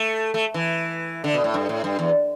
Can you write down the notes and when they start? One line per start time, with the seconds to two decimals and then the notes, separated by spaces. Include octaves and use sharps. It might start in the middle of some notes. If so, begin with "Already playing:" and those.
Already playing: A3
0.34 A3
0.54 E3
1.24 D3
1.34 B2
1.44 A2
1.54 G2
1.69 A2
1.84 G2
1.99 E2